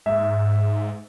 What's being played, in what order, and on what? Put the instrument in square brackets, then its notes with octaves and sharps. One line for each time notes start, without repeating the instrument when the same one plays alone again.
[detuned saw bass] G#2 [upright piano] E5